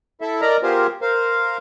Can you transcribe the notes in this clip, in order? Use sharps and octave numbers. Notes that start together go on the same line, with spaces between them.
E4 A4 E5
A#4 D5 D#5 A#5
B3 F4 G4 G#4 A#4 C5
A#4 C5 F5